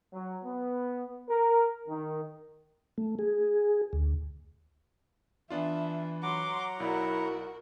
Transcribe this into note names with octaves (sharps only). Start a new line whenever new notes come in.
F#3
B3
A#4
D#3
A3
G#4
D2
E3 B3 D4 F4 E5
F#3 F#5 A#5 C6 D6
B1 E4 F#4 A#4 D5